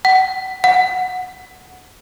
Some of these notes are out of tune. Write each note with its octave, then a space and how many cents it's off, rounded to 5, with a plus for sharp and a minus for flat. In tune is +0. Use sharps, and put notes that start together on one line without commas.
F#5 +30
F#5 -10